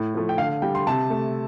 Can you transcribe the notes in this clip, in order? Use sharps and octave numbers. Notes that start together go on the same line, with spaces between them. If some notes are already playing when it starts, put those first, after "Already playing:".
Already playing: A2
F3 A3
G5
D3 F5
G3 G5
C6
C3 A5
A3